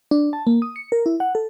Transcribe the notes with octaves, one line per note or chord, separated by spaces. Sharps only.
D4
A5
A#3
D#6
C#7
A#4
E4
F#5
A4